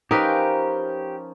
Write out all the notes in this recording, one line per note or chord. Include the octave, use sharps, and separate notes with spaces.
F3 C#4 D#4 G4 A#4 B4